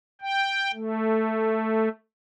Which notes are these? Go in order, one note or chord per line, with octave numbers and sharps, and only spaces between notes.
G5
A3